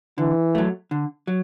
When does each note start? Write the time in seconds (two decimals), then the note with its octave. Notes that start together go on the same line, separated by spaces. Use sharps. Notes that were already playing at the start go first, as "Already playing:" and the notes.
0.18 D3 E3
0.55 F#3 A3
0.91 D3
1.27 F#3